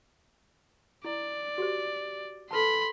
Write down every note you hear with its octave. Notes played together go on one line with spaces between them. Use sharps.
E4 D5
F#4 G4 C5
A4 B4 A5 B5 C6